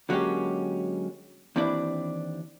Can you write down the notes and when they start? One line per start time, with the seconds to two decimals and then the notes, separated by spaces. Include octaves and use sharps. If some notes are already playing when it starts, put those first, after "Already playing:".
0.09 D3 F#3 G#3 A#3 C#4 G4
1.56 D#2 E3 C4 D4 E4 D5